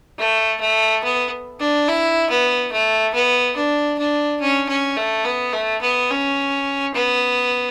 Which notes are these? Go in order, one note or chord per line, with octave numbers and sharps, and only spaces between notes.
A3
A3
B3
D4
E4
B3
A3
B3
D4
D4
C#4
C#4
A3
B3
A3
B3
C#4
B3